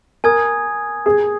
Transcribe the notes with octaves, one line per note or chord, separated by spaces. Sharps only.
A#4 G#5 D#6 G#6
G#4